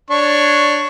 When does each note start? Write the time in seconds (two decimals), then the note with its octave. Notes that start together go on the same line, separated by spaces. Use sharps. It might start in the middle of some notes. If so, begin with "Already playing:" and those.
0.10 D4 C#5 C#6